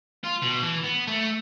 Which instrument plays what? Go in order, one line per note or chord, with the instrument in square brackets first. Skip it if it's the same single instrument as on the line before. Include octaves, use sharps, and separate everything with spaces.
[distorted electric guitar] F4
B2
E3
B3
A3